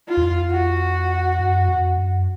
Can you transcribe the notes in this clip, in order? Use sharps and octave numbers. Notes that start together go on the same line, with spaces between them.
F4
E2
F2
F#4
F#2
F2
F#2